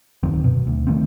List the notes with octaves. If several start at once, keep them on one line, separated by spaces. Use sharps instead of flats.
D1 F#2 D#3 C4
B2
D2
D#3 A3 B3 C4